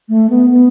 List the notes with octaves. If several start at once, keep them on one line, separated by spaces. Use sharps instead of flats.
A3
B3
B3